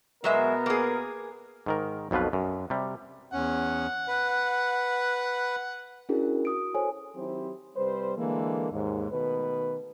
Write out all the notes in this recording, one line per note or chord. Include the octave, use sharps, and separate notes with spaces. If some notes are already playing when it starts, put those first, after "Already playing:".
B2 F#3 G#3 B3 A#4 E5
A#3 G#4
G#2 D#3 A#4
B1 F2 B2 F4 B4
F#2
C3 G3
E2 C#4 F#5
B4
C#4 D4 E4 F#4 G#4 A#4
F#4 D#6 D7
A4 C5 C#5 G#5
D#3 F#3 C4 E4 G4 C5
C3 G3 B4 C5
D3 E3 G#3 A#3
D#2 G#2
B2 D#3 A3 B4